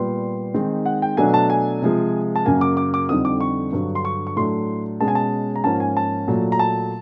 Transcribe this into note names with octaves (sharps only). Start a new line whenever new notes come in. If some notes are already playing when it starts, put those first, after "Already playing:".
Already playing: A#2 G3 B3 C6
D#3 G#3 C4 D#4
F#5
G5
B2 F#3 A3 D4 G#5
A5
G#5
C3 F3 G#3
A5
F#2 C#3 F#3 A#3 G#5
D6
D6
D6
F2 D3 G3 C4 D#4 D#6
D6
C#6
G2 D3 F#3
C6
C#6
C#6
A2 F#3 A3 D4 C6
B2 G#3 C#4 A5
G#5
A5
A#5
G#2 F3 A#3 C#4 A5
G#5
A5
A#2 F#3 A3
A#5
A5